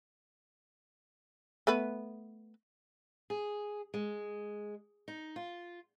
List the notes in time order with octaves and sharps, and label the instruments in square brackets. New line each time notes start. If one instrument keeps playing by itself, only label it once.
[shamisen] A3 B3 B4
[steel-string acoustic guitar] G#4
G#3
D#4
F4